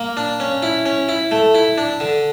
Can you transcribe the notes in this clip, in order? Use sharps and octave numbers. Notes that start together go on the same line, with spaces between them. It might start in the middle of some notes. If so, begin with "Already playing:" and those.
Already playing: A#3
D4
C#4
E4
C#4
E4
A3
E4
D4
D3